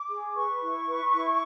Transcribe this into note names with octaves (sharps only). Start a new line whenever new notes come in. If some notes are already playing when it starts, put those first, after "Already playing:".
Already playing: D6
G#4
B4 C#6
E4
B4
E4